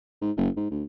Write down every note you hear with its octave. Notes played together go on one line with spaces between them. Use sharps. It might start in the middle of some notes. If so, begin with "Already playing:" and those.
G#2
F#1
G#2
D2